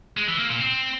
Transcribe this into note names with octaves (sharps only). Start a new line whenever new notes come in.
G#3
E3
A#3
A#2
C4